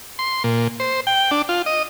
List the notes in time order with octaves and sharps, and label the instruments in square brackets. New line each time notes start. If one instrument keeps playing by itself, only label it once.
[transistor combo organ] C6
A#2
C5
G5
D4
F4
D#5